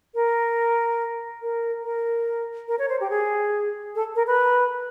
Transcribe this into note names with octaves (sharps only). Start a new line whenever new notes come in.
A#4
A#4
A#4
A#4
C#5
C5
G4
G#4
A4
A#4
B4